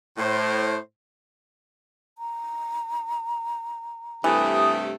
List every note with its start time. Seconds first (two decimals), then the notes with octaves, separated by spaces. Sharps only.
0.18 A2 C5
2.18 A#5
4.24 G2 C3 E3 A3 D#6